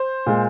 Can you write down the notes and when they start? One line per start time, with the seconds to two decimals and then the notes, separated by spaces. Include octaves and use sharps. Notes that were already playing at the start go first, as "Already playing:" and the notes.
Already playing: C5
0.26 A#2 G#3